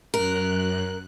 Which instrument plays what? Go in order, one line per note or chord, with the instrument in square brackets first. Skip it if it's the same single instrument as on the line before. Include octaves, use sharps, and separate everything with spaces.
[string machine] F#2 F#6 [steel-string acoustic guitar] A#4